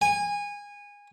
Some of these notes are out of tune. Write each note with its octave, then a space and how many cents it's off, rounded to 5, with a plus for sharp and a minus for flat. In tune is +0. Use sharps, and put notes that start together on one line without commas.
G#5 -20